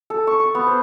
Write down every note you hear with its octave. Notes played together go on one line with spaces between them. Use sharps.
A4
C#6
C#6
B3
C5